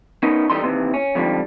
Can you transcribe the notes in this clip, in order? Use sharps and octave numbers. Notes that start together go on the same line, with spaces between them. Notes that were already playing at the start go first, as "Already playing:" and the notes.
B3 C#4 D#4 A#4
A2 E3 G3 A3 D#4 C6
D#2 C3 E3
C#4
F2 G#2 D3 F3 G3